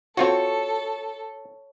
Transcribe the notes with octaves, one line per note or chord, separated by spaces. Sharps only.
C4 F4 F#4 A4 C#5